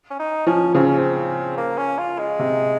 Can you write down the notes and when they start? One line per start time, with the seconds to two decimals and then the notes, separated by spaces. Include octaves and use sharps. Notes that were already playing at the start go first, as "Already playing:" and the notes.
0.10 C#4
0.19 D#4
0.46 F3 C#4
0.74 C#3 C4
0.86 C#4
0.98 C4
1.57 A#3
1.77 C#4
1.98 F4
2.19 G#3
2.39 C3